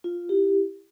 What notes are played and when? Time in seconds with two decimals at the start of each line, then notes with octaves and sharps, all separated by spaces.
0.04 F4
0.29 E4 G4